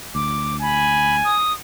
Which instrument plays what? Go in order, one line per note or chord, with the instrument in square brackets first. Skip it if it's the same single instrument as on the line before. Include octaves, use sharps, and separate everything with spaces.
[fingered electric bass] D2 [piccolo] D6
[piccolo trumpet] G#5 [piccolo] B5
[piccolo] D#6